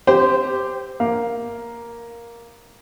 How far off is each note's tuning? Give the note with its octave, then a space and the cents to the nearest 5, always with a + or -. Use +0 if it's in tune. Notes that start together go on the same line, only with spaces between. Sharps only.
C4 +0 G4 +0 C5 -25
A#3 +0 F5 +0